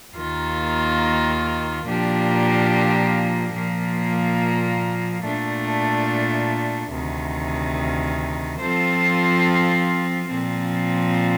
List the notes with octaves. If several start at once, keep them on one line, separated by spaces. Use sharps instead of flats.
D#2 D#3 A#3 F4
A#2 F3 A#3 D4 G4
A#2 F3 A#3
A#2 A3 D4
D2 C3 D#3
F3 C4 F4 A4 C5
A#2 F3 C4